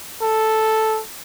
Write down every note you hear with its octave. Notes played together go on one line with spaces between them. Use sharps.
A4